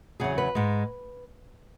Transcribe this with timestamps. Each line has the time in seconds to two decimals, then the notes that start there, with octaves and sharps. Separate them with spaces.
0.20 E2 C#3 F#3 G#4
0.38 B4
0.55 G#2 G#3